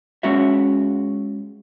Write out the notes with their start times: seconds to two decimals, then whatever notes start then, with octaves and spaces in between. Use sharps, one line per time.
0.23 G#3 C#4 F#4 E5